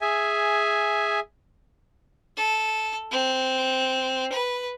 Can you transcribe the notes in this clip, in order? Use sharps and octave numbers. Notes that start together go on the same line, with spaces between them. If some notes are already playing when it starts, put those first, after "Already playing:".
G#4 E5 G#5
A4
C4
B4